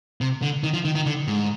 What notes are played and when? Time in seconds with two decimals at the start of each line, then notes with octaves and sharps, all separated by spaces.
0.21 C3
0.42 D3
0.64 D#3
0.74 F3
0.85 D#3
0.95 D#3
1.06 D3
1.28 G#2